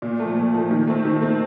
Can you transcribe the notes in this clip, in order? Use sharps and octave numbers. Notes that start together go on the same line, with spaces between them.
A#2
F3 A3
A#2
F3 A3
D#3
A3 C4
D#3
A3 C4